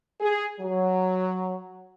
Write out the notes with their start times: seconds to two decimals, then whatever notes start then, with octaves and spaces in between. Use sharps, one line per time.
0.20 G#4
0.60 F#3